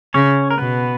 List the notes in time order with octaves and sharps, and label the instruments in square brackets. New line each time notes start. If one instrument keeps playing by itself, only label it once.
[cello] C#3 [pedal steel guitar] C#4 C#5
[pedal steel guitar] A#4
[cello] B2 [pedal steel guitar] B3 B4